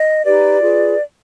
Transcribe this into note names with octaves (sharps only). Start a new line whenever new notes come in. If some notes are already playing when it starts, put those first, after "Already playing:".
Already playing: D#5
D#4 G4 B4 D5
F4 G#4 B4